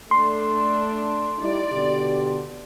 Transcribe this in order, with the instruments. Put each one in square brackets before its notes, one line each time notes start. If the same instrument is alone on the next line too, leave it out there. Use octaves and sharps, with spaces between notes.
[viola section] A3 D4 [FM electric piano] C6
[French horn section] G3 D#4 E4 [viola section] D5
[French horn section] B2 D3 G4